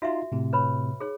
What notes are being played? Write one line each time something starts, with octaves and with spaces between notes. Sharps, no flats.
D#4 F4 F#4 E5
A2 C3
B4 C#5 B5
G#4 C#5